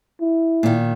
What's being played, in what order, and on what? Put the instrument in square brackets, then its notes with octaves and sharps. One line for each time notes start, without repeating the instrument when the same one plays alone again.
[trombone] E4
[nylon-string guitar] A#2 D#3